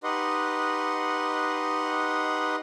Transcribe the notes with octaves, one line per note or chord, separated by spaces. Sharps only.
D#4 G4 B4 D#5 F#5 C6